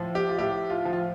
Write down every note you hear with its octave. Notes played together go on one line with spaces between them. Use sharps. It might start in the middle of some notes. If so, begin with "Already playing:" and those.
Already playing: A2 F3
G4
F4
A2 G4
F4
F3
F4